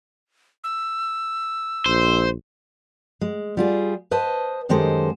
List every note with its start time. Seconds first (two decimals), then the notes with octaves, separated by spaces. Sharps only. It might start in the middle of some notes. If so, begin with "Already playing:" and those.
0.64 E6
1.86 A#1 C5
3.21 G#3
3.57 G3 F4 G#4
4.11 B4 C5 D#5 A5
4.69 F#2 D#3 G#3 G4 A4 C5